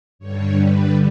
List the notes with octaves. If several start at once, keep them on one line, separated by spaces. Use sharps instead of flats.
G2 D3 G3 C#5
B4